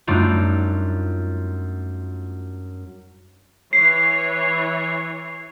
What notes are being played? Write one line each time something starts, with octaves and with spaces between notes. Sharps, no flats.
F#2 G3 A3 D4 D#4 F4
E3 C#5 C7